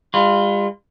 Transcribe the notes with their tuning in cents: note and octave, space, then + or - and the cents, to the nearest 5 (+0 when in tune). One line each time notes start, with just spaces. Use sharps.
G3 +45 F4 +0 B4 +0